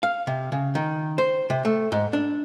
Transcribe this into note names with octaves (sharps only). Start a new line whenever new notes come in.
F5
C3
C#3
D#3
C5
C3
A3
G#2
D4